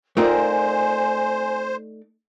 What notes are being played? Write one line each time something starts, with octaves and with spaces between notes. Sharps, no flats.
A3 C4 D#4 F4 A#4 C5 D5 G#5